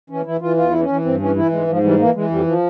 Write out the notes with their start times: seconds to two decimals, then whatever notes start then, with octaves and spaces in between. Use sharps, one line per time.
0.10 E3 C#4
0.26 E3 E4
0.41 E3 F4
0.57 E2 F4
0.70 E3 E4
0.81 C#4
0.88 E3
1.05 G2 C4
1.20 E3 C#4
1.36 E3 E4
1.52 G#2 G#3
1.67 G#2 F3
1.83 E3 G3
1.99 E3 A#3
2.15 E3 G#3
2.30 F2 G3
2.46 F3